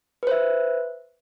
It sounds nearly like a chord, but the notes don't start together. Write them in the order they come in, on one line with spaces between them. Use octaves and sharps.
B4 C5 E5